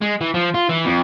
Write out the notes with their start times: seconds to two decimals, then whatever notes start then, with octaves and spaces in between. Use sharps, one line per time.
0.01 G#3
0.21 E3
0.34 F3
0.54 F4
0.69 E3
0.85 F2